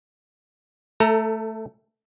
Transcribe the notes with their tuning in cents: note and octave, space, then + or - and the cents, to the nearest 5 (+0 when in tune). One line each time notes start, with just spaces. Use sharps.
A3 +0 A4 +25 A#5 +0